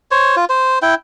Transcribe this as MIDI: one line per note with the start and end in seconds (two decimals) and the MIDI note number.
0.11 0.36 72
0.11 0.36 73
0.37 0.45 65
0.49 0.79 72
0.82 0.95 64
0.82 0.95 79